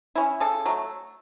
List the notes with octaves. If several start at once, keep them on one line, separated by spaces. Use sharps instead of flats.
C#4 E4
C#3 A4
F#3 A3